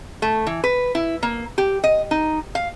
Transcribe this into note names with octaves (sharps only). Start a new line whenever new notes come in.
A3
E3
B4
E4
A#3
G4
D#5
D#4
F5